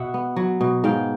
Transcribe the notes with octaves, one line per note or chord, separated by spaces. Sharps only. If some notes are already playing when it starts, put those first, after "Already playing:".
Already playing: B2 E5 F#5
B3
F#3
B2
G#2 F5 G5